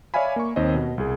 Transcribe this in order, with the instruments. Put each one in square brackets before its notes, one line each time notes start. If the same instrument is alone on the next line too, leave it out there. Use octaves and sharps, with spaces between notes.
[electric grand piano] C#5 D5 E5 F5 G#5 B5
A#3 C#6
D#2 C4 C5 D#5
B2
C2 G#4